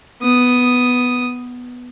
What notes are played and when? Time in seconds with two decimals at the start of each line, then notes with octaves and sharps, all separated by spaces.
0.22 B3 D#6